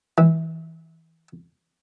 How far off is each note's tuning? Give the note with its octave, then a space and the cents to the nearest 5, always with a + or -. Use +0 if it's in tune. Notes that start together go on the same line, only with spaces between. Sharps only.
E3 -20